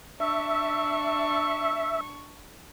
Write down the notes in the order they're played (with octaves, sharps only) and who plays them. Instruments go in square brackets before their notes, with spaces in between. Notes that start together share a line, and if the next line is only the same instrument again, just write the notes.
[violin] D4 C#6 [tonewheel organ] E5